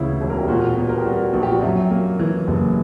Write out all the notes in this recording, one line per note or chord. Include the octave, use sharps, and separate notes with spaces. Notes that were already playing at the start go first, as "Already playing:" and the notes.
Already playing: D2 C#3 E3 E4
E1
A#4
G4
A#2 F#4
B3
A#4
G4
G3 F#4
A#1 F#4
G4
F#4
F#2 E5
A#3
E3
F#1